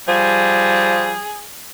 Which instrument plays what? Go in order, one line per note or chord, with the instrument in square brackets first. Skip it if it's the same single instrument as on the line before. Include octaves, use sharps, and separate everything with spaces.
[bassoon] F3 [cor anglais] G3 [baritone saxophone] G#4